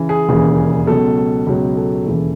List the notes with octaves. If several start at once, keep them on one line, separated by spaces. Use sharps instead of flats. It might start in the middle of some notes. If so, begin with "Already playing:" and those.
Already playing: C#3 E3
G#4
E1 D#2 C#3 E3
C#2 B2 F#3 A4
C#2 B2 F#3
A4
E1 D#2 C#3 E3